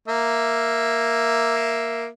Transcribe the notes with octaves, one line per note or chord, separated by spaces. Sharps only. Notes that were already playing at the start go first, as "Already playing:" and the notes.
A#3 E5